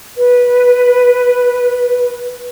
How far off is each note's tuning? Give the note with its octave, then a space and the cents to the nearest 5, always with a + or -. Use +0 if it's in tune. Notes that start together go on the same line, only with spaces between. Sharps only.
B4 -10